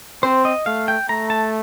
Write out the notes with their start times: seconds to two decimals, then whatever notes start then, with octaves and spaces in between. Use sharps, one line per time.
0.23 C4 C5
0.45 D#5
0.66 A3 F5
0.88 G5
1.09 A3 A#5
1.30 A5